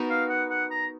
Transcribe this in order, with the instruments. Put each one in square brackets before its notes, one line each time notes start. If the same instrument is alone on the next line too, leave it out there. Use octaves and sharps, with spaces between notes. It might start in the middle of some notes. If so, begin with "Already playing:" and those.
Already playing: [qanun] B3 D#4 F#4 A#4
[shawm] F5
F#5
F#5
A#5